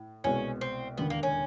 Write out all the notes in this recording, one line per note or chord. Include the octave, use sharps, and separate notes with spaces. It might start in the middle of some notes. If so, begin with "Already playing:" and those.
Already playing: A2
C2 B2 G#3 C#4
C4
E1 D#2 D3 B3
A#3
C#4